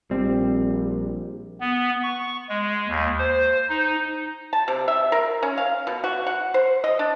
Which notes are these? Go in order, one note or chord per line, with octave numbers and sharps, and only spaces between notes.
A#1 G3 C4
B3
C#6
G#3
D#2
C5
D#4
A5
C3
E5
A#4
C#4
F5
B2
F#4
F#5
C5
D#5
D4